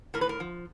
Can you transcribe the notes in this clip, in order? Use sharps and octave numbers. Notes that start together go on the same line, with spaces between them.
A2 A#4
B4
A#4
F3